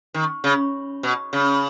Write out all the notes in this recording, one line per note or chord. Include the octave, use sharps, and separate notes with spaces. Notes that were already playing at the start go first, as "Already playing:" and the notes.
D#3
C#3
B2
C#3